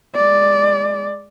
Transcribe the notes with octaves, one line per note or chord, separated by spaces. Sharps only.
G#3 D5